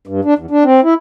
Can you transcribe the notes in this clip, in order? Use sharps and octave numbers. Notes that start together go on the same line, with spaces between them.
G2
D4
E2
D4
C4
E4